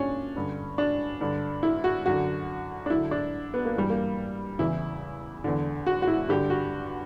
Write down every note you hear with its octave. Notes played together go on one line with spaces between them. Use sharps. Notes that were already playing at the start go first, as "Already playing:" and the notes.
Already playing: A#2 C#4 D4
G2 D3
D4
G2 D3
E4
F#4
F#2 D3 F#4
D4
F#2 D3 E4
D4
B3
A#3
G2 E3 G3
A#3
E2 C#3 E3 E4
E2 D3
F#4
F#4
E4
G2 D3 G4
F#4